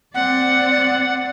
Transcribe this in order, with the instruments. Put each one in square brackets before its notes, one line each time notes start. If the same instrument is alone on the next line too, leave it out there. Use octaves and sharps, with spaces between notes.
[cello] C4 D5 [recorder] F#5